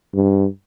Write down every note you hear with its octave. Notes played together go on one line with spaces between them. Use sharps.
G2